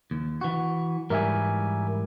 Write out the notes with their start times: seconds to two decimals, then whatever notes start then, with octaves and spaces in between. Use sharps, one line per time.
0.11 D#2
0.41 E3 F#4
1.10 G#2 E3 G3 A#4 E5 G#5